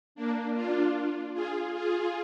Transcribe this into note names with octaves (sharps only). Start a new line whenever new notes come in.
A#3 D4
D4 F4
F4 G#4
F4 G#4